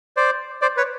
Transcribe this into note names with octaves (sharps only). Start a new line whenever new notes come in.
C5 D5
C5 D5
B4 C#5